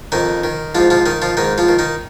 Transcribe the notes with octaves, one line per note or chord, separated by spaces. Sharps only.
F2 D#3 D#4
D#3
G#2 F3 F4
F3 F4
D#3 D#4
F3 F4
G#2 D#3 D#4
F3 F4
D#3
D#3 D#4